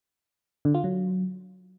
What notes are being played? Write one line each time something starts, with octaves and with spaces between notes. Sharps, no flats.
D3
F4
F#3